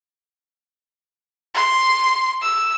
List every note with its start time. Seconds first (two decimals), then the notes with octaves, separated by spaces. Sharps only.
1.55 C6
2.42 E6